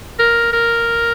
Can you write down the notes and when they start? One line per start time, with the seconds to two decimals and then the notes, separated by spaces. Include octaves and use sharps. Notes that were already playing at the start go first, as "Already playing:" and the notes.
0.19 A#4
0.53 A#4